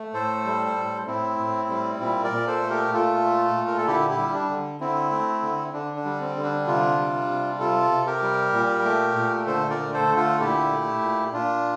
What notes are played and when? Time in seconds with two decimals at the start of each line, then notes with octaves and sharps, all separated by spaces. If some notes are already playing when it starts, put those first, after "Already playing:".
Already playing: A3
0.14 A2 A4 C5
0.45 G3
0.76 A2
1.07 A2 C4 E4
1.39 A2
1.69 G3
2.00 A#2 C4 E4
2.23 A#4 D5
2.32 A#2
2.47 A4 C5
2.62 A3
2.70 G4 A#4
2.94 A#2 F4 A4
3.24 A3
3.56 A#2
3.67 A#4
3.77 A4
3.87 D3 E4 G4
4.10 E4 G4
4.18 G3
4.34 D4
4.49 D3
4.80 D3 C4 E4
5.11 A3
5.42 D3
5.73 D3 D4
5.97 D4
6.05 G3
6.20 C4
6.36 D3
6.43 D4
6.67 C3 D4 F4
6.98 G3
7.29 C3
7.60 C3 F4 A4
7.91 C3
8.07 G4 A#4
8.22 G3
8.54 A#2
8.85 A3
9.16 A#2
9.47 D3 A4 C5
9.70 A#4 D5
9.78 A3
9.93 A4 C5
10.08 D3
10.17 F4 A4
10.40 A#2 E4 G4
10.71 A3
11.02 A#2
11.33 A#2 D4 F4